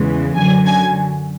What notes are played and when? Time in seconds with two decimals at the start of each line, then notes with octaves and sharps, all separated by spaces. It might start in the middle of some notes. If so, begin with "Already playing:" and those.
Already playing: E2 C#3 E3 G#3
0.36 F#2 D3 F#3 G#5
0.66 G#5